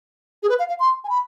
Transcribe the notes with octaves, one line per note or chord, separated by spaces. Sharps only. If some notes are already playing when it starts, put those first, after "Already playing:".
G#4
B4
F5
F5
C6
G#5
B5